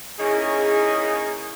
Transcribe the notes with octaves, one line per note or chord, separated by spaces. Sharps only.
C#3 A#3 C#4 D#4 E4 G#4